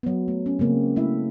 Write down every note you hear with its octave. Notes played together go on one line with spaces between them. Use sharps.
F#3 B3
A3
C#4
C#3 G#3 A#3 C4
A3 E4 E5